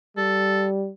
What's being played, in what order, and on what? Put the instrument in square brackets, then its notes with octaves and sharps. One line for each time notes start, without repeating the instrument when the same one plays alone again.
[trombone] G3 [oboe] A4